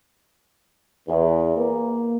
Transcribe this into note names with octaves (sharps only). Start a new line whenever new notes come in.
E2
A#3